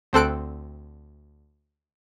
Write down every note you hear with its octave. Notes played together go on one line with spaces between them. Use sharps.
D2 C4 A4 F#6 D7